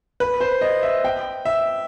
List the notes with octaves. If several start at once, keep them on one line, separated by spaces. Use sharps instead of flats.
B4
C5
D#5
E5
G5
E5